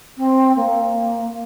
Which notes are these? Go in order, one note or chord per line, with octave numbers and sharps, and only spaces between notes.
C4
A#3